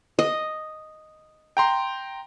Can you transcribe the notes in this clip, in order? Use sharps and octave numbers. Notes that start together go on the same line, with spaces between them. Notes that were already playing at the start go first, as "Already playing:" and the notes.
D#5
G5 A#5 C6